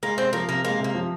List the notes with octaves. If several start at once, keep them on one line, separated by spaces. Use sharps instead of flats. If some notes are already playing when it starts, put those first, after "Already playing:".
G#3 A#3
C3 C4
F3 A#3
C3 A#3
G#3 A#3
C3 A#3
F3